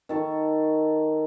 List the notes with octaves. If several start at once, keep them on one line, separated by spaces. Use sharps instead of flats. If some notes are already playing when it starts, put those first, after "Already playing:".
D#3 A4 C#6